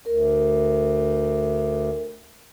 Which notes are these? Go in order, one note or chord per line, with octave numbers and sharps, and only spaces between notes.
D2 A#4